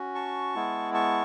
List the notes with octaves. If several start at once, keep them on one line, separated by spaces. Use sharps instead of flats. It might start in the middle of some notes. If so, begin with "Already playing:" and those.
Already playing: C#4 F#4
A5 C#6
G#3 B3 E4
A5 C#6